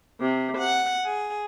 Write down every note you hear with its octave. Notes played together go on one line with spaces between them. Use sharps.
C3
F#5
G#4